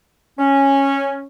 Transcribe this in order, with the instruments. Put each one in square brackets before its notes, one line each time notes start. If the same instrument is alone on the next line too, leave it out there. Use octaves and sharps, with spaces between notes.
[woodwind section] C#4